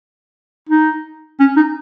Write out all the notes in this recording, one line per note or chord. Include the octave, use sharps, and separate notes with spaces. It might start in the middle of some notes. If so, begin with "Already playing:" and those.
D#4
C#4
D#4